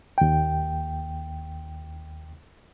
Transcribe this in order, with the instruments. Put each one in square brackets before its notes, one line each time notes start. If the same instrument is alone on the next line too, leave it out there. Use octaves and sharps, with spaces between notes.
[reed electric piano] D#2 G5